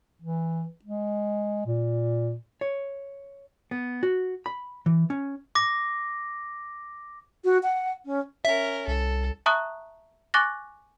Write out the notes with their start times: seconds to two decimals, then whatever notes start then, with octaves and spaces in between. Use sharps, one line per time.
0.22 E3
0.85 G#3
1.66 A#2
2.61 C#5
3.71 B3
4.03 F#4
4.46 B5
4.86 E3
5.10 C#4
5.55 D6 A#6
7.44 F#4
7.63 F#5
8.05 C#4
8.45 C#4 A#4 E5
8.87 C2 A4
9.46 E5 A5 A#5 C#6 D#6 F#6
10.34 G#5 C#6 D6 F#6 A6 A#6